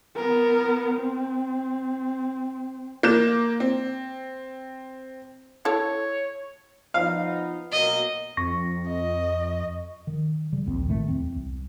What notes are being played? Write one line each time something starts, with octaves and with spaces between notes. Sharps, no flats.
B3 A#4
C4
A#3 G6 E7
C4
E4 A4 C#5
F3 B3 D#4 F5
B2 F#3 A#3 D#5
F2 C#6 A#6
D#5
D#3
C#3 G3
A#1 D#2 A#2 C4
A1 A2 D#3 A3
D1 E2 C4
C2